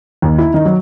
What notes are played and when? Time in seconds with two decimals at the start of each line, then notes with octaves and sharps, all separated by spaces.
0.22 D#2
0.38 E4
0.54 D#3
0.65 F#3